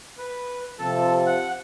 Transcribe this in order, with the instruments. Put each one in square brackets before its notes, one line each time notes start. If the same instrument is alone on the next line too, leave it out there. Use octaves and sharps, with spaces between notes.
[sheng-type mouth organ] B4
[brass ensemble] C3 F3 [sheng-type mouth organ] A4 A5
[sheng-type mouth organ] F#5